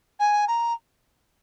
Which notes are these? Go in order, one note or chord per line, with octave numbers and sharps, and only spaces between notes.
G#5
A#5